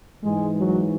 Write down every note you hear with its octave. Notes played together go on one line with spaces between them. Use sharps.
G#2 E3 G#3
F#3